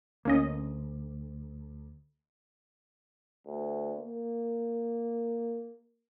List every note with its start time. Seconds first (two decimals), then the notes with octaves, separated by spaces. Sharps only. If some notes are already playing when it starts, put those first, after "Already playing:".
0.25 D2 A#3 C#4 D#5
3.47 D2
4.00 A#3